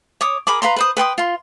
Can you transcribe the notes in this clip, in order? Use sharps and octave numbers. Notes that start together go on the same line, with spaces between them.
C#5 D6 D#6
G#4 A#4 B5 D6
B4 F5 A#5 C6
B4 C5 D#6
B4 G5 C6 D#6
F4 C6